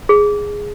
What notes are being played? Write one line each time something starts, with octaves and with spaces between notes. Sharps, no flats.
G#4